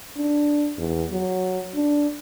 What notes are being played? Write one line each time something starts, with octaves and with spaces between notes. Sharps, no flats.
D4
E2
F#3
D4